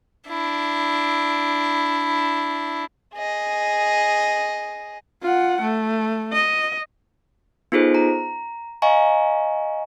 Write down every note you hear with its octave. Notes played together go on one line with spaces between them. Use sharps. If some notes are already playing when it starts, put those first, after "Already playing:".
D4 E4
G#4 D#5
F4 F#5
A3
D#5
B3 D#4 F4 G#4 A4 C5
A#5
D#5 F5 G#5 A#5 C#6